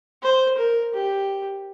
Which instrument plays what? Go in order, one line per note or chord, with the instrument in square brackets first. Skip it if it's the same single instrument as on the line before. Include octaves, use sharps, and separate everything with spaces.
[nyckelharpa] C5
A#4
G4